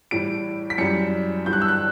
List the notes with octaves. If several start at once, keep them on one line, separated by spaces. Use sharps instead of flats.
A2 E3 G3 D7
B6
F#2 E3 G3 C#7
G2 E3 G3 G6
F#6
E6
F#6